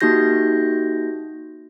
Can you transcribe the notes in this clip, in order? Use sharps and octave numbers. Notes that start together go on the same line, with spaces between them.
A#3 D#4 F#4 G4 G6 A#6